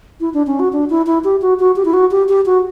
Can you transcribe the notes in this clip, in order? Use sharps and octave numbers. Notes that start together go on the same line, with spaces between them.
E4
D4
C#4
F#4
D4
E4
E4
G4
F#4
F#4
G4
E4
F#4
G4
G4
F#4